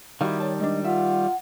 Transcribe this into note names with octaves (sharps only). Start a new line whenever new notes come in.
D#3 G3 E4 F#4 F5
C#5 A5
G#3 D4 D#5
F4 E5 F#5